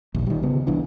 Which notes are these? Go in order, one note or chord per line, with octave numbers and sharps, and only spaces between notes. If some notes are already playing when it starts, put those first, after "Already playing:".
A#1 D#2
D#3 G3
C#3 B3
C2 E3 D4